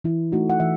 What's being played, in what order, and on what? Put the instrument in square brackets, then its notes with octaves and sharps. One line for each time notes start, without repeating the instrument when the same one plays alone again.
[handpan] E3 E4
A3 D#4 F#4
F#5
E3 E5